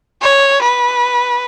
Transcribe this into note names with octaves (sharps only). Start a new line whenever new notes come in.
C#5
B4